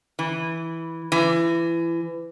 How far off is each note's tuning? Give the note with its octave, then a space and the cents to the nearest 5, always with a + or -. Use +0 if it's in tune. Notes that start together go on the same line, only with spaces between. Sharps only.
E3 -5
E3 +25